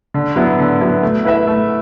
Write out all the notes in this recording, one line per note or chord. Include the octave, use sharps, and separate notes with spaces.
D3
F#3 B3 E4
D3
F#3 B3 E4
A3
E4 B4 E5
A3